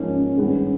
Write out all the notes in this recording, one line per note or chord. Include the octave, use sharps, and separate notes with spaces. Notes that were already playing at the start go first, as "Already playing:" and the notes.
Already playing: G#2 F3 A#3 C#4
G2 D#3 G#3 B3